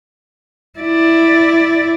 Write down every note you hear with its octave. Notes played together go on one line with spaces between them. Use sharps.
E4 D5